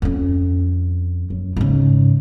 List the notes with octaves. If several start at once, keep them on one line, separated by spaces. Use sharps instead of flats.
F2 C#4
F#2
G#2 C#3